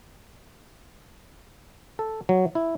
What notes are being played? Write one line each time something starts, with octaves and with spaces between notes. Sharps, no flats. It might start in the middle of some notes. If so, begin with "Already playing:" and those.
A4
F#3
E4